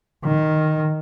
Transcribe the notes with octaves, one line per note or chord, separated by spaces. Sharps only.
D#3